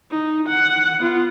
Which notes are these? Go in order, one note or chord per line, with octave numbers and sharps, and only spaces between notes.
D#4
F#5
B3 F4